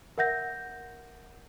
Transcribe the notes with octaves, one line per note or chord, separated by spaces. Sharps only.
A#4 E5 F#5 G6 A#6